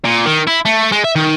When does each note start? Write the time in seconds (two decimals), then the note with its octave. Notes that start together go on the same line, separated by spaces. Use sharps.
0.04 A#2
0.26 D#3
0.47 E4
0.65 A3
0.92 G#3
1.04 E5
1.15 D#3